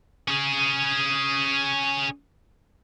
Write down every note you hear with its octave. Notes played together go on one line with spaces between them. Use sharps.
C#4 G#4